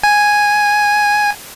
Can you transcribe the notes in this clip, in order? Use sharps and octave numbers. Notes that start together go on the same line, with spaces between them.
G#5